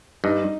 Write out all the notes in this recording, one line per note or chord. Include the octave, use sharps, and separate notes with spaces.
G2 D#4 D#5